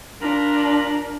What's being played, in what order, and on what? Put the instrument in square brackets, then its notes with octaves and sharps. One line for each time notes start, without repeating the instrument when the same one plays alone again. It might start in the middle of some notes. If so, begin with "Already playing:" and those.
[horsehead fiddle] D4 [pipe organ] F4 A#5 B5 [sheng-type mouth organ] A#4